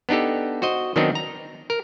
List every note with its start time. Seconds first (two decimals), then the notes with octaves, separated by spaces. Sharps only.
0.09 B3 D4 D#4 G4 A4
0.62 F#4 C5 D#5
0.96 D#3 F#3 B3 C4 D4 D#4
1.15 A#5
1.70 A#4